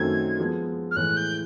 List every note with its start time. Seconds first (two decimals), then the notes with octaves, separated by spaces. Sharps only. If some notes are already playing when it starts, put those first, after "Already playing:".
Already playing: F#2 D#3 F#3 A3 C4 G#6
0.40 F3 G#3 B3
0.91 F6
0.96 A2 E3 G#3 F#6
1.16 G6